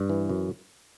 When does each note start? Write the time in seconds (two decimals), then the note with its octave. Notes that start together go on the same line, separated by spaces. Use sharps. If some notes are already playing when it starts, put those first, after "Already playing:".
Already playing: G2
0.09 E3
0.29 F#2